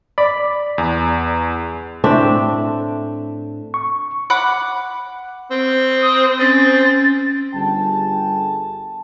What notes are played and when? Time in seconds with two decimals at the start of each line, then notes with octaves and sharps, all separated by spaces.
0.18 D5 B5
0.78 E2
2.04 A2 C4 D4 E5
3.74 C#6
4.30 F#5 B5 D6 F#6
5.51 C4
6.02 D#6
6.39 C4 C#4 A6
7.54 G1 G3 G#4 G5 A5